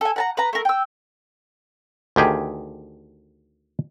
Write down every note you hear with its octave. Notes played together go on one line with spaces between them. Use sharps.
A4 G#5
F#5 A5 A#5
B4 A#5
A3 A#4
G5 E6
D2 D#3 G4 G#4